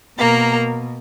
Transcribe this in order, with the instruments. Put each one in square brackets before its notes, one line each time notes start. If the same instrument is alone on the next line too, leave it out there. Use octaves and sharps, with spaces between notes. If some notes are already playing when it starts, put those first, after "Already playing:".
[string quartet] B2 A#3 A#4